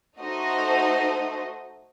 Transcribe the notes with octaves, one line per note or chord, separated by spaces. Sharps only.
A3 D#4 F#4 C5 D#5